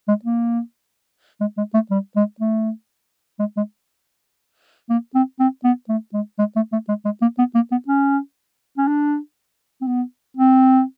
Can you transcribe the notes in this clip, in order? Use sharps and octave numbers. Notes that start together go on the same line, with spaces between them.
G#3
A#3
G#3
G#3
A3
G3
G#3
A3
G#3
G#3
A#3
C4
C4
B3
A3
G#3
G#3
A3
A3
G#3
G#3
A#3
B3
A#3
B3
C#4
C#4
D4
C4
B3
C4